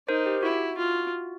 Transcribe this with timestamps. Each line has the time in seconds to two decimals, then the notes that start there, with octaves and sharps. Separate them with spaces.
0.08 D#4 A#4 C5
0.26 G4
0.43 E4 F#4
0.78 F4